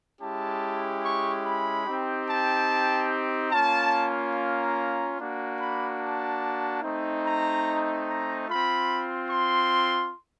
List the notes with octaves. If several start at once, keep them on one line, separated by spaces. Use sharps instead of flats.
G#3 C#4 E4 G4 A5
C#6
B5
C4 D#4 G4
A5
A#3 C#4 F4 A5
A#5
A#3 D4 F#4
B5
A5
A3 C4 D#4
A#5
A#5
C4 F4 B5
C6